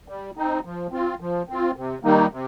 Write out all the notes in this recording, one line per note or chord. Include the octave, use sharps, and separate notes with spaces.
G3
C4 D#4
F3
C4 F4
F3
C4 F4
C3
D#3 G3 A#3 D#4
C3